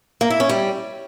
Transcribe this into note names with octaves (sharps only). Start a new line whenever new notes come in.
A#3
E4
C#4
G3